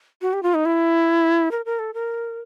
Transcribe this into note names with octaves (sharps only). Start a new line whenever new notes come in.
F#4
G4
F4
D#4
E4
A#4
A#4
A4
A#4